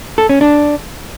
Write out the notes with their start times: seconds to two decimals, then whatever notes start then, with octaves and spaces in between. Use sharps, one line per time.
0.18 A4
0.29 C#4
0.41 D4